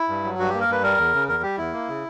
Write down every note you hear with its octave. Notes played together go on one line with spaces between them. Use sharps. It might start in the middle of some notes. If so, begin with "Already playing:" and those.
Already playing: E4
G2
F#3
G2 F#4
A#3 G4
A#4
G2 B4
G3 A#4
E2
C#3
E2 A#4
G3 G4
E2 E4
A#3
C#3